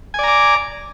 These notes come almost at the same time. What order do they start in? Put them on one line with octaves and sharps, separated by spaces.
G#5 D5 A#5 D6